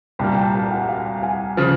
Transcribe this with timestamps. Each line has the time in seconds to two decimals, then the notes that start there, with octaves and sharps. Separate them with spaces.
0.19 C2 A#2 G3 A#3 G5 A5
0.36 G5 A5
0.55 G5 A5
0.71 F#5 G#5
0.89 F5 G5
1.22 F#5 G#5
1.57 C#3 F3